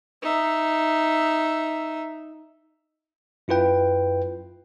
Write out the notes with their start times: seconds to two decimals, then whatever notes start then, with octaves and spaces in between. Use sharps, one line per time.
0.22 D#4 E5
3.48 F#2 E4 F4 B4 G5